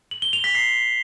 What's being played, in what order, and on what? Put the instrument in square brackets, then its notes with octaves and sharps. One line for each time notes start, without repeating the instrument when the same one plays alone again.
[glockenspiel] F#7
G7
F7
B6
C7